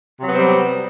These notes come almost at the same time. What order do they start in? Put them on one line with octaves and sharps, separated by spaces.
C3 F#3 B3 C4 G3